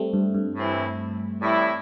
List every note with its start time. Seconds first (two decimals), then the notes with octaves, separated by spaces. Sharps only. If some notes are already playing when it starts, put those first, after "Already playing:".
Already playing: G3 A3 C4
0.13 G2
0.34 G2
0.56 A2 E3 C4 E4
1.42 A2 E3 G3 E4